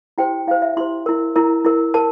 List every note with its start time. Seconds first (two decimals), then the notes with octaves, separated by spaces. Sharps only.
0.18 E4 G4 C5 G5
0.47 E4 G4 C5 F5
0.62 E5
0.77 E4 G4 C5 C6
1.06 E4 A#4
1.36 E4 A#4 A#5
1.65 E4 A#4
1.94 A#4 A5